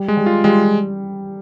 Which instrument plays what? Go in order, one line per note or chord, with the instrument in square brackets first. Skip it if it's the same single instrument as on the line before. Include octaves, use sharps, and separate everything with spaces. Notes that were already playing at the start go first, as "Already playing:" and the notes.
Already playing: [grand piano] G3
[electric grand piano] G#3
[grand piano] G3
[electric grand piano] F4
[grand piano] G3 [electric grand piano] G#3